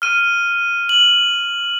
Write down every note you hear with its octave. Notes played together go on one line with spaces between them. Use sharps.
F6 D#7
F#7